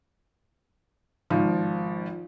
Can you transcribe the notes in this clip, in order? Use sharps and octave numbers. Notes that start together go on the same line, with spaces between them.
G#1 F3